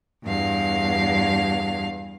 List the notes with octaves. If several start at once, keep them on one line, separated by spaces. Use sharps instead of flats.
E2 G2 F5